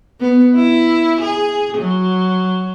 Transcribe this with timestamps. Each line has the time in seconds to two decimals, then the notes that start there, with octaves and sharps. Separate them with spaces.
0.20 B3
0.55 E4
1.21 G#4
1.78 F#3